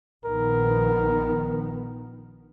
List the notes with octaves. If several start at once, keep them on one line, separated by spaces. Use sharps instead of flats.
A#1 D#3 B3 A#4